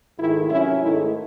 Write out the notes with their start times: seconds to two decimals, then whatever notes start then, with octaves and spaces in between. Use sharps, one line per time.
0.18 G#2 D#3 A3 E4
0.49 C3 F#3 C#4 E4
0.80 G#2 D#3 A3 D#4 E4